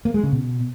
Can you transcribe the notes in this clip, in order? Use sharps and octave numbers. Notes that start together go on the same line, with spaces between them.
A#3
G#3
C#3
B2